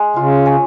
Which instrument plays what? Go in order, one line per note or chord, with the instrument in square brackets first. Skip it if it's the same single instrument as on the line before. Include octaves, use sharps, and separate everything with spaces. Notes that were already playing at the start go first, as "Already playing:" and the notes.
Already playing: [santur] G#3
[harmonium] C#3 [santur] F4
[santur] C#4